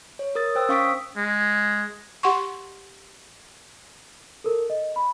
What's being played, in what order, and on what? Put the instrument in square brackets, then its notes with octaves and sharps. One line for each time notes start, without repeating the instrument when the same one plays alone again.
[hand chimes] C#5
A#4 D#6 A6
C5 G5 E6
C#4 F5 C#6 D#6 B6 D7
[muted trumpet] G#3
[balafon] G4 F#5 C6 C#6
[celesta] A4 A#4
D#5
B5